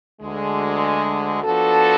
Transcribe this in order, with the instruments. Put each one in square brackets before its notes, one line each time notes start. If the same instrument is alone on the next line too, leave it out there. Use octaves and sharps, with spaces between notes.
[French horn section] D2 D3 G#3
F3 B3 D4 F#4 A4